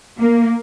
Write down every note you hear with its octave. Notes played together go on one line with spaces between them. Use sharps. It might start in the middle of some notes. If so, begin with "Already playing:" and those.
A#3